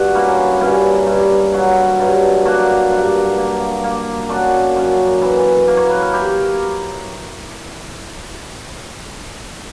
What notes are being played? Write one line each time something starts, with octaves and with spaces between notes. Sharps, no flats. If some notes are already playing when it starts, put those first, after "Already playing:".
Already playing: G2 F#4
A#3 C#4 E4
G2 C#4 E4
G2
F#3
G2
A#3 D4 F#4
G2
A#3
A#3
F#2 D4 F#4
F#2
E3
A#3
C#5
B4
A#4
E4 G4